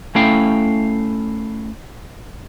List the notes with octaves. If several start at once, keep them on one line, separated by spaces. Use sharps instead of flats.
A3 C#4 E4 F5 G5